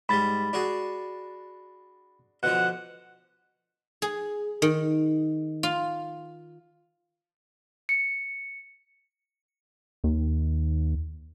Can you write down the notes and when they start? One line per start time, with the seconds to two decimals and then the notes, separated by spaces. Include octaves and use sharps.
0.09 G#2 G3 B5 A6
0.53 D4 F#4 G#4
2.43 B2 D3 F3 F#5
4.02 G#4
4.62 D#3
5.63 F4
7.89 C#7
10.04 D#2